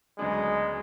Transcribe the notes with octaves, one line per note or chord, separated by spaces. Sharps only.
D2 C#3 F#3 G#3 B3 D4